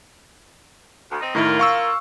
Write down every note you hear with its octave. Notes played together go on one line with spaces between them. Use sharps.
D2
C4 D#4
A2 D#3 A#3 E4 F4
F5 C#6 E6